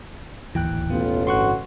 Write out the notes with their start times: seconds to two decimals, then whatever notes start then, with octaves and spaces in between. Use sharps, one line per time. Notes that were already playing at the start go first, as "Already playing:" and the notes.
0.55 D1 G#1 D#2 E3 G5 F#6
0.90 A1 B2 B3 F4
1.27 G1 D3 F#4 C6 C#6 F#6